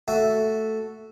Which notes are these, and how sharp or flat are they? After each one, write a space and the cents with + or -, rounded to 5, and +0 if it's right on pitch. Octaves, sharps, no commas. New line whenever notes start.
A3 +0 F#4 +0 E5 +0